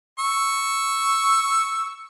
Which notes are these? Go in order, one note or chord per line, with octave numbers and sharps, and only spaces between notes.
C#6 E6